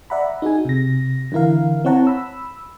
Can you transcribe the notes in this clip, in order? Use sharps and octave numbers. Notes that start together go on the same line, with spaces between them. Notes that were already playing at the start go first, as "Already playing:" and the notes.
D5 E5 F#5 A#5 B5
D#4 F#4 G#4 G#5
C3 A#6
D3 E3 E4 A#4 F5
C4 E4 C#5 F#5 A5 A#5
B5 E6